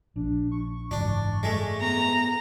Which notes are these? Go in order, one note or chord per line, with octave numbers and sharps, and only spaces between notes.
A#1 D4
C#6
F#1 G#2 E3 D4
G#3 A3
B3 A#5